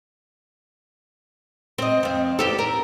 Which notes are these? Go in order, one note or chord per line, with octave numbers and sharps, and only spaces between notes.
C4 D#5
F2 C4
E2 G4 A4
A#4